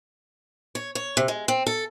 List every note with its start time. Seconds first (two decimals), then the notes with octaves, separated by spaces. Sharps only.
0.75 C#5
0.95 C#5
1.17 C3
1.28 G#3
1.48 C4
1.67 A4